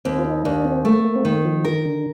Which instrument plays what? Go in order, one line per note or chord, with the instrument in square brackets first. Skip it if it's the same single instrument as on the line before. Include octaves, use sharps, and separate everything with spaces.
[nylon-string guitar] D#2 [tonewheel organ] C4
[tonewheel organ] F4
D#4
[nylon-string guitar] D#2 [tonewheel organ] D4
[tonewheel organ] C4
[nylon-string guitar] A3 [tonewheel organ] A#3
[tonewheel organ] A#3
C4
[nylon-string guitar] D#3 [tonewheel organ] A#3
[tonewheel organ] F3
[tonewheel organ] D#3 [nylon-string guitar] A#4
[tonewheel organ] D3